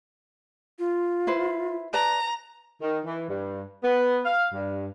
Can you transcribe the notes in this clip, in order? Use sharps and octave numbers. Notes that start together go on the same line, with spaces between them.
F4
E4 B4 C5
B4 D5 A5 A#5
D#3
E3
G2
B3
F5
G2